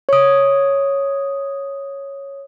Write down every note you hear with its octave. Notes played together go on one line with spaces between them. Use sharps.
C#5 D#6